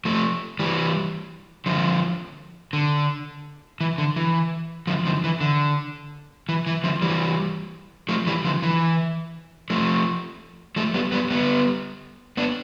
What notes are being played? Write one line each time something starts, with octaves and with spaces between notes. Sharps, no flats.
F3 A3
E3 G3
D3 F3
D3
E3
D3
E3
D3 F3
D3 F3
E3
D3
E3
E3
D3 F3
E3 G3
F3 A3
E3 G3
D3 F3
E3
F3 A3
F3 A3
G3 B3
G3 B3
G3 B3
B3 D4